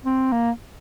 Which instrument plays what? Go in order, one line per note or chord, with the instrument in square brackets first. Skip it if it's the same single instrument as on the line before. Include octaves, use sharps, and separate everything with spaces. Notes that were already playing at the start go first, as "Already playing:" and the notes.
[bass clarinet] C4
A#3